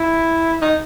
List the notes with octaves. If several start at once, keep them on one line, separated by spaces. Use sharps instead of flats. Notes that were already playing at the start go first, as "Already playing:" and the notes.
Already playing: E4
D#4